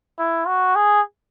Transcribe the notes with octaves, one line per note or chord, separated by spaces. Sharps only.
E4
F#4
G#4